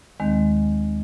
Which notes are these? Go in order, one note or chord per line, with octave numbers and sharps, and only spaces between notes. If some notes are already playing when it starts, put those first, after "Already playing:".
D#2 D#3 G#3 C4